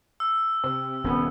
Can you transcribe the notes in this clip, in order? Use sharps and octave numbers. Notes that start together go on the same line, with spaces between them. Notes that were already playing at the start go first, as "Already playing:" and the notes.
E6
C3
D#1 B3 C#4